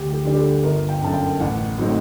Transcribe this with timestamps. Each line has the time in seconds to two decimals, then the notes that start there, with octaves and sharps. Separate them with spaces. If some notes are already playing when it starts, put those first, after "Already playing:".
Already playing: D2 G4
0.12 G4
0.25 D3 G3 D4
0.33 G4
0.38 A4
0.63 G1 A#4
0.89 G5
1.02 F#2 D3 A5
1.14 G5
1.40 A1 F#5
1.78 A2 F#3 C4 D#4